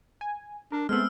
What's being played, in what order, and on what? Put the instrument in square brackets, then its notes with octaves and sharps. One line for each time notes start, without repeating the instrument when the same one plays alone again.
[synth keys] G#5
[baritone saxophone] D4 [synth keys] A#4
[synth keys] G#3 A3 B3 [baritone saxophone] C4 [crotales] E6 F6